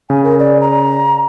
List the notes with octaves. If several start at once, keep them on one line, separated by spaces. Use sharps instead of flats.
C#3 G#5
A#4
D5
A#5